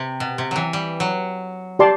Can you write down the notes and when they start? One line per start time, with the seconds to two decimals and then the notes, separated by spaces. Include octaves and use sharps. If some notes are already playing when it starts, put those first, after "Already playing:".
Already playing: C3
0.20 B2
0.38 C3
0.51 E3 F#3
0.73 G3
1.00 F#3
1.79 G4 D5 A5 C6